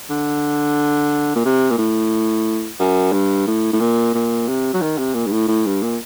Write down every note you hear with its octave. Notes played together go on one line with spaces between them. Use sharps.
D3
A#2
C3
A#2
A2
F#2
G2
A2
A2
A#2
A#2
C3
F#3
D#3
C3
A#2
G2
A2
A2
G2
A#2